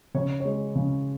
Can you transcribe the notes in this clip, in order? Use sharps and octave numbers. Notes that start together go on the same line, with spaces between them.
C#3 C#5
G#3 C#5
C#3